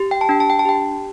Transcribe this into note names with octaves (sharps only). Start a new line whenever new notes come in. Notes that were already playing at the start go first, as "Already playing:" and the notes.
Already playing: G4
G5
A5
D4 G5
A5
G5
A5
G4 G5